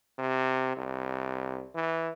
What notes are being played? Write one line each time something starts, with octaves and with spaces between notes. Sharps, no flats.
C3
C2
E3